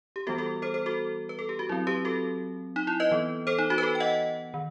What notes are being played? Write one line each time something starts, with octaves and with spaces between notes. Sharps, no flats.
G4
E3 G3 B3 F#4 A4
F#4 A4
A4 C5
A4 C5
F#4 A4
B4
A4
G4
F#4
F#3 C4 E4
G4 B4
F#4 A4
D#4
E4
B4 D#5
E3 B3
A4 C5
D#4
D#4 F#4
B4
F#4 A4
G5
D#5 F#5
D#3